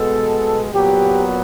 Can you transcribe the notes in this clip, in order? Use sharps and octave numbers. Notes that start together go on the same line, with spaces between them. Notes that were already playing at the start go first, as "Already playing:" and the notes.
Already playing: B2 G#3 B3 A4
A#2 F#3 B3 G4